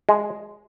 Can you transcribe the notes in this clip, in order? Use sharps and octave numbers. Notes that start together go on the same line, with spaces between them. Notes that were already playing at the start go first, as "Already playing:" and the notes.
G#3